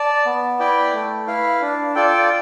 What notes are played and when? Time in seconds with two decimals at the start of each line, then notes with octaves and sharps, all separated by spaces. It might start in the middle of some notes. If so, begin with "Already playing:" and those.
Already playing: D5 A5
0.26 B3
0.59 E4 B4 D5 G5
0.93 A3
1.27 E4 B4 F5
1.62 D4
1.95 F4 A4 D5 G5